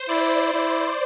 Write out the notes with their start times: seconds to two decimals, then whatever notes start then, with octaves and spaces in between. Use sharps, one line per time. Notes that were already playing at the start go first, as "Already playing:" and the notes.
Already playing: C5
0.09 E4 D5
0.54 E4